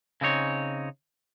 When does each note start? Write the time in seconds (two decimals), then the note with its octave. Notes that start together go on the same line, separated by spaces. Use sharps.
0.21 C#3 C4 D#4 C#5